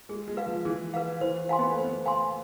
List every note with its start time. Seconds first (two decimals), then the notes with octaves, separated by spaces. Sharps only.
0.09 G#3 G#4
0.28 G#3
0.37 B4 F5
0.47 F3
0.65 E3 G#4
0.94 B4 F5
1.21 E3 C5
1.49 F5 G#5 C6
1.59 B3
1.72 A3
1.78 C5
1.85 B3
2.06 F5 G#5 C6